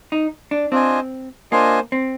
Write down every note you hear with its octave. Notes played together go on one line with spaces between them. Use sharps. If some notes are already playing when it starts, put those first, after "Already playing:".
D#4
D4
C4 D4 F4 C5 D#5 G#5
A#3 D4 F4 C5 D#5 G#5
C4